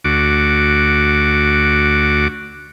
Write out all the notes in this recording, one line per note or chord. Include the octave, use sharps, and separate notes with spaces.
D2 F#4 D6